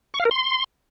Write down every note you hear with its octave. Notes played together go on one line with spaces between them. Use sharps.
C#6
F5
A#4
C6